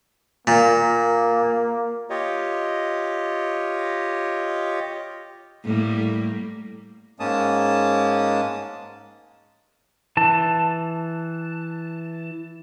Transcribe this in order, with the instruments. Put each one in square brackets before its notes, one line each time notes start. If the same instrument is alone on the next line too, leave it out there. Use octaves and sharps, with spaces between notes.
[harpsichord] A#2 [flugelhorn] A#3
[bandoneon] F4 G4 C#5 D#5
[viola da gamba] A2 G3 A#3
[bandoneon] G#2 G#3 A#3 C#4 A5 D#6
[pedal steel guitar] E3 A5